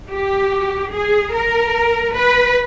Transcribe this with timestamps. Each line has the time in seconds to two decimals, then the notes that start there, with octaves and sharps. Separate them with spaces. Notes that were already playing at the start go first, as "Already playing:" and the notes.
0.11 G4
0.93 G#4
1.34 A#4
2.15 B4